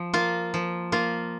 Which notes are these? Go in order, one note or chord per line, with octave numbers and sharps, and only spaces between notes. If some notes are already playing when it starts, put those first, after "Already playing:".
Already playing: F3
A#3 F4
F3
A#3 F4